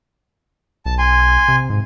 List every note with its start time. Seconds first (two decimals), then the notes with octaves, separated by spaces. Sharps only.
0.86 B1 A5
0.98 G#5 C6
1.48 C3
1.70 G#2